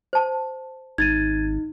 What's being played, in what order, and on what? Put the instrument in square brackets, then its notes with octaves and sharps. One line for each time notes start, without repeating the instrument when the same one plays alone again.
[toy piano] C5 A5
[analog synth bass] G#1 [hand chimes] D#4 [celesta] G#6 A6 D#7